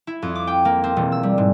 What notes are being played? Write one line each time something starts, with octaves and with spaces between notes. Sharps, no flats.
E4
F2
D6
G5
A#3
C4
E1
E6
G3
G#2